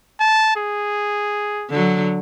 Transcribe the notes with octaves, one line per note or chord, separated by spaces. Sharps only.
A5
G#4
D3 F#3